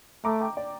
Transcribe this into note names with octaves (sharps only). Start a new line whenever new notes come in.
A3 A#5 D6
G5 A#5
D5